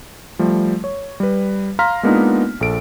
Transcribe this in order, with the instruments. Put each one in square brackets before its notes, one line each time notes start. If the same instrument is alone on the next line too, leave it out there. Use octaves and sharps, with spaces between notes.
[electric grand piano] F3 G3 A3
C#5
G3 B4
F5 A#5 C6 F6 A#6 B6
G#3 A#3 B3 D4 D#4 F4
A#1 A4 D7